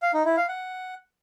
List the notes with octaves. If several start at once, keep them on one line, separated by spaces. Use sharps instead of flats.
F5
D#4
E4
F5
F#5